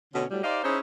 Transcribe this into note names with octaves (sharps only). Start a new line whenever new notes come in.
B2 D3 A3 C#4
A2 F#3 G3
D#4 G4 C5 D5 D#5 F5
C#4 D#4 E4 G#4 C5 C#5